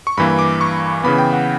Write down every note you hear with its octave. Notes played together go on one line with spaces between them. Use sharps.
C#6
G2 E3 A#3 B5
D6
C#6
C#3 E3 B3 B5
G5
F#5